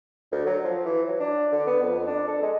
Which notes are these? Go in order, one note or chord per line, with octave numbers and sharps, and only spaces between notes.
D2
F#3
F3
E3
F#3
D4
D3
B3
F2
D4
A4
G#3